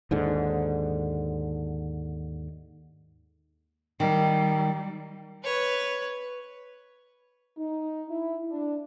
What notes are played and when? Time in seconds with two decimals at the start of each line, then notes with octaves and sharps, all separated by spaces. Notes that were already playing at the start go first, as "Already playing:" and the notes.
0.11 D#2 G#2 D3
4.00 D#3 G3
5.44 B4 C#5
7.57 D#4
8.09 E4
8.50 D4